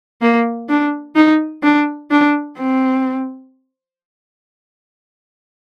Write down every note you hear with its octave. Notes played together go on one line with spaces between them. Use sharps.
A#3
D4
D#4
D4
D4
C4